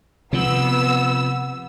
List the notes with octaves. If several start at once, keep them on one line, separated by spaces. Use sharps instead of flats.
C3 F3 B3 E6